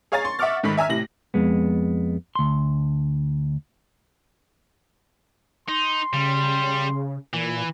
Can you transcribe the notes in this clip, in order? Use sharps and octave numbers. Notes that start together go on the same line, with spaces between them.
G#4 C#5 F5 G#5 A#5 A6
C6 C#6
E5 F#5 C#6 D6 F6 A6
G#2 D#3 A4 B5 B6
E5 G#5 A#5 E6 F6
A2 C3 A#6 F#7
F2 G#3 B3
D2 C6
D#4 C6
C#3 G3
A#2 E3